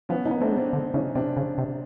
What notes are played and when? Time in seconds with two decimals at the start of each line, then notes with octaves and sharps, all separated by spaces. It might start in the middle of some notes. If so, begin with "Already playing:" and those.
0.09 F3 B3 C#4
0.25 C#4 D#4
0.31 B3
0.41 A3 C4 D4
0.52 G#3
0.57 C4 D4
0.73 D3
0.94 C#3 C#4 D#4
1.15 C3 C4 D4
1.37 C#3
1.58 C3